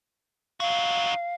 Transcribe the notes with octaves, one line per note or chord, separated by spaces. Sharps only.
D#4 F#4 F5